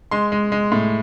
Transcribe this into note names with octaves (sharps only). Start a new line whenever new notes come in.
G#3 C6
G#3
G#3
A2